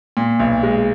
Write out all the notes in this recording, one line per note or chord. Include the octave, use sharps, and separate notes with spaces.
A#2
B1
G#3